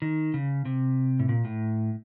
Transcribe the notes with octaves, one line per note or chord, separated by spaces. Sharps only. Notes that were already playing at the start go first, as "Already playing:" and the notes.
D#3
C#3
C3
A2
A#2
A2